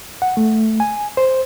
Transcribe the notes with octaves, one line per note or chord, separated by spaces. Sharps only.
F#5
A3
G#5
C5